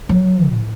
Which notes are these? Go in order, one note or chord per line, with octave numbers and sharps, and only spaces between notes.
F#3
A2